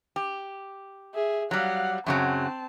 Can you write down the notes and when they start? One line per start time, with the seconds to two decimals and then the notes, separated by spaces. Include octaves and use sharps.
0.16 G4
1.14 G#4 E5
1.51 F#3 G3 F5 F#5
2.06 F#2 C#3 F#3 C4 A5